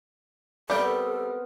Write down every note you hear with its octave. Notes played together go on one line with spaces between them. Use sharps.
G3 B3 C4 A4 A#4 G5